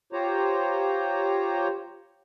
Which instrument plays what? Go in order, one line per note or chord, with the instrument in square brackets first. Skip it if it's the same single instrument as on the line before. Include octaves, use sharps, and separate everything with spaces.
[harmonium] F4 G4 C5 C#5 A#5